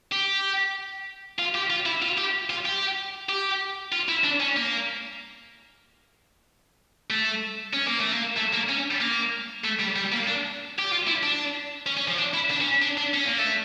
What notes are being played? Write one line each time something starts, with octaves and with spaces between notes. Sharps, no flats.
G4
F4
G4
F4
E4
F4
G4
F4
G4
G4
F4
E4
D4
C#4
A#3
A3
C#4
A#3
A3
A#3
A3
A#3
C#4
A#3
A3
G3
G3
A#3
D4
G4
F4
E4
D4
C#4
C#4
F3
D4
E4
D4
C#4
D4
D4
C#4
A#3
A3